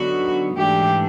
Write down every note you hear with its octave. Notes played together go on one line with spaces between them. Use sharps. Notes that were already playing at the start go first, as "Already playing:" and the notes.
Already playing: D3 F#3 B3 D#4 F#4
G#2 E3 A3 D4 G4